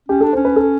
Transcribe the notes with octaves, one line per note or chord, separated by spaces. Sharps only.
C#4 G4
D4 A4
C#4 C5
B4
A4